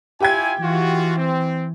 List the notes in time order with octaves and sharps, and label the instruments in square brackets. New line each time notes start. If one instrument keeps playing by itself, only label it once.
[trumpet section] E4 F4 G#5 [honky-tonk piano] G4 G5 G#6
[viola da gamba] E3 [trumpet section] F4 F#4
[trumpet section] C4